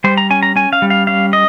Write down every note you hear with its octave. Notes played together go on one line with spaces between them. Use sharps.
G3 C5
A#5
C#4 G#5
A#5
C#4 G#5
F5
G3
F5
C#4 F5
D#5